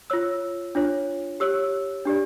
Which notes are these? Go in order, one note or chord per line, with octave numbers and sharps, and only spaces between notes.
F4 C#5 E6
D4 F4 C#5
G4 C#5 E6
D4 G4 D5